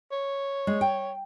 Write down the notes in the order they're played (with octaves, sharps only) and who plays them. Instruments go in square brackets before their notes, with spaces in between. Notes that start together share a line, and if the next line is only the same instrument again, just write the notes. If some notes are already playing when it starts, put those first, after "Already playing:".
[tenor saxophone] C#5
[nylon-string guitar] G#3
G5